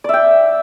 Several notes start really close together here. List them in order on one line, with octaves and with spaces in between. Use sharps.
D5 E5 G5